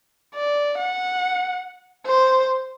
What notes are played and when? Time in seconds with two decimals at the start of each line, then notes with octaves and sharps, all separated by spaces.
0.35 D5
0.78 F#5
2.06 C5